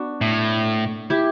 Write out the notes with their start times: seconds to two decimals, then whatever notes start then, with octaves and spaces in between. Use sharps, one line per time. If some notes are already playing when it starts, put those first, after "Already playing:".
Already playing: B3 D4 F#4
0.21 A2
1.10 E4 G4